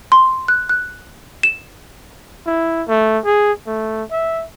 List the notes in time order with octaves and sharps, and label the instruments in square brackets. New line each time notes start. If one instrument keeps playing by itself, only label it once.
[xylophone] C6
F#6
F#6
E7
[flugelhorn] E4
A3
G#4
A3
E5